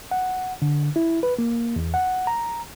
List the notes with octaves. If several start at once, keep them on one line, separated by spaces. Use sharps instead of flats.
F#5
D3
E4
B4
A#3
E2
F#5
A#5